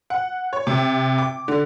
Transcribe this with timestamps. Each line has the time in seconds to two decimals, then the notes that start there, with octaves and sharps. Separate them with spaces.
0.10 F#5
0.53 C#5
0.67 C3
1.18 D6
1.48 D3